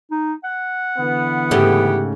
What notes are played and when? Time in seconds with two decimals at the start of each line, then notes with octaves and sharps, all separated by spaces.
0.11 D#4
0.44 F#5
0.99 D3 E3 B3
1.51 G#2 C#3 A3 G4